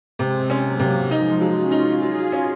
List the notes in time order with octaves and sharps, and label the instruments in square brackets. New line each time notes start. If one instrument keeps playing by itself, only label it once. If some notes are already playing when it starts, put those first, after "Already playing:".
[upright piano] C3 [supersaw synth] G#3 C4
[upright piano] C#4
[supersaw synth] F#3 A#3
[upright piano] C3
[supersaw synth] F3 G#3 [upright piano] D#4
[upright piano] F#3
[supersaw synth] C#4 F4
[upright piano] D#4
[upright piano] F#3 [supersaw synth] F4 G#4
[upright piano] C#4